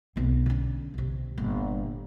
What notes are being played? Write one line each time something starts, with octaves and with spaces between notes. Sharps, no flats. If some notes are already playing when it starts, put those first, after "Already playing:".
B1 C4
D3 C#4
B1 C3
G1 A#2